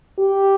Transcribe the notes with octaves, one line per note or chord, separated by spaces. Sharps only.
G4